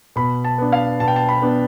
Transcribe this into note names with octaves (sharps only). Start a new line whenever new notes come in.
B2 B5
A5
B3 D4
F5
B2 A5
G5
A5
B5
B3 D4